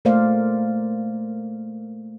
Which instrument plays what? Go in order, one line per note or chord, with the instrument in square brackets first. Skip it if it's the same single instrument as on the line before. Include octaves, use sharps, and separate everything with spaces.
[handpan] A3 A#3 A#4 C5 D5 F5